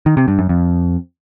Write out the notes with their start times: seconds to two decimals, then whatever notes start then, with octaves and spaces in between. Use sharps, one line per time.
0.06 D#3
0.17 C3
0.28 G2
0.39 F#2
0.49 F2